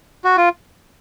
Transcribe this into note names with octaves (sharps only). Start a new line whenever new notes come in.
F#4
F4